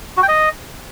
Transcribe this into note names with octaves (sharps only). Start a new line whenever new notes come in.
F#4
G5
D#5